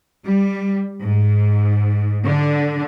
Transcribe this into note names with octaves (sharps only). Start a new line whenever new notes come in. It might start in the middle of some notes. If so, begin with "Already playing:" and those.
G3
G#2
D3